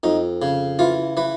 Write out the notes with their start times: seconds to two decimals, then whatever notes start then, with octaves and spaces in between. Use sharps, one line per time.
0.03 F2 D#4
0.42 C#3
0.79 E3 F4
1.17 E3 B4